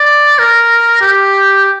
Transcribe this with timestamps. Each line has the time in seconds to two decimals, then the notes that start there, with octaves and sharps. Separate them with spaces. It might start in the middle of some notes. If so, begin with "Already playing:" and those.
Already playing: D5
0.39 A#4
1.02 G4